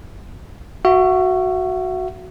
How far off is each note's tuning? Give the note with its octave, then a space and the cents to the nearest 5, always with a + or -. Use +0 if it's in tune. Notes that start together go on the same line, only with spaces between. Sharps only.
F#4 +0 E5 +35